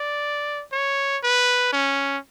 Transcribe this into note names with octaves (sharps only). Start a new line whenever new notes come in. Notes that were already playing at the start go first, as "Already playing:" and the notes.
Already playing: D5
C#5
B4
C#4